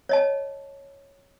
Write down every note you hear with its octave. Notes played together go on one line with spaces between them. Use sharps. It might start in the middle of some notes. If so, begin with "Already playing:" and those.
C#5 D#5 A5